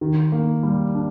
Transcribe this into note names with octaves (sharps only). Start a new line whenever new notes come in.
D#3
A#3
G3
D4